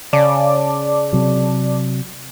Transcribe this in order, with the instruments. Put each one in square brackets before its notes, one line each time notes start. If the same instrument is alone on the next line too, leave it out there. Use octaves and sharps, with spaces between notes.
[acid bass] C#3 [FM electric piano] D5 A5 D6
[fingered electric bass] C3 F#3